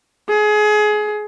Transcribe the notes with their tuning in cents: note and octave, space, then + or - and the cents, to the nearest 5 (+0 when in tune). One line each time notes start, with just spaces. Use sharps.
G#4 +25